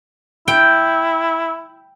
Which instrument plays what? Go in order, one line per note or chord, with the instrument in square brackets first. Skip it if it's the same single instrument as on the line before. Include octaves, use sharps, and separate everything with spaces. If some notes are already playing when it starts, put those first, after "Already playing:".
[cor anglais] E4 [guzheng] G5